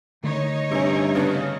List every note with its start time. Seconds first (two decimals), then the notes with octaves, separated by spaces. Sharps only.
0.23 D3 D#3 A3 D#4 C#5 D#5
0.71 G2 C3 C#4
1.15 C#3 B3 D4